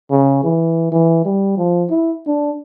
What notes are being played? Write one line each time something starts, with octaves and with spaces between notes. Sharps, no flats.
C#3
E3
E3
G3
F3
E4
D4